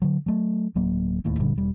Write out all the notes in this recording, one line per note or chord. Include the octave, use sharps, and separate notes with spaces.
D3 F#3
F#3 A3
D1 F#3 A#3
D1 D#2 A2
F#1 A#2 D3 G3
E1 G3